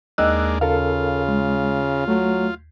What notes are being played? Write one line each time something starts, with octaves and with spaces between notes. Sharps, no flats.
D#2 G#3 A#3 D4 D#5 E6 F#6
C#3 F4 A4 A#4 F5
G#3
F#3 A3